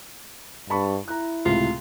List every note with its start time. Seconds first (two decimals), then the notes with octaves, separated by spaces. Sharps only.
0.70 G2 A5 B5 C#6
1.08 E4 A#5 F#6
1.45 C#2 A2 C3 F4